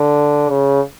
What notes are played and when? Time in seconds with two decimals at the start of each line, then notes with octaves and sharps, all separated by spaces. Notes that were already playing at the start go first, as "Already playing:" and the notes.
Already playing: D3
0.49 C#3